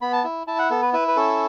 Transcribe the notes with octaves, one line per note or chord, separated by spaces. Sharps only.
B3 B5
A5
E4
E4 A5
F#5
B3 A4
B4
E4 B4
B4
C#4 A4